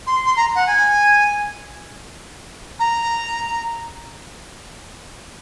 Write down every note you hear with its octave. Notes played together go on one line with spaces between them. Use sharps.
C6
C6
A#5
F#5
G#5
A#5